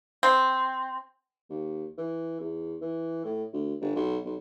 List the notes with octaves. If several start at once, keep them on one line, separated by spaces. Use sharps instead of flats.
C4
D#2
E3
E2
E3
A2
D2
G1
B1
B1